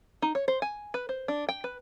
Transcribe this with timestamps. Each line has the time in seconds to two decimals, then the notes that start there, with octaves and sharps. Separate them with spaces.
0.22 D#4
0.35 C#5
0.48 C5
0.62 G#5
0.94 B4
1.09 C5
1.28 D4
1.49 G5
1.64 B4